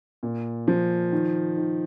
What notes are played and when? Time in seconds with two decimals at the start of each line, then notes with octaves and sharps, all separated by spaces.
0.23 A#2
0.68 F3
1.12 D#3
1.57 D#3